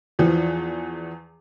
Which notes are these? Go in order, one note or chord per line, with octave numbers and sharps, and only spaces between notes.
E2 E3 F3